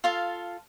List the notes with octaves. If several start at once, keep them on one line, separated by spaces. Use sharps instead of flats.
F4 A4 F5 A5